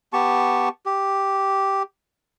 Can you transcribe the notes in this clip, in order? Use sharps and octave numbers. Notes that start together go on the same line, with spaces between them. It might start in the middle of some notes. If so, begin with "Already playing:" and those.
B3 G4 A5 C#6
G4